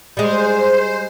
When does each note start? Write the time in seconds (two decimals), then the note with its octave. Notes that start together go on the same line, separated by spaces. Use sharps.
0.17 G3 G#3 C5